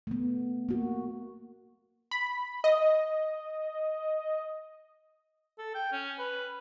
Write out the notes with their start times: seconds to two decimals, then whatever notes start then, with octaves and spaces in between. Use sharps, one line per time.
0.07 A3 B3
0.69 A#3 F#4
2.11 B5
2.64 D#5
5.58 A4
5.75 G5
5.92 C#4
6.19 B4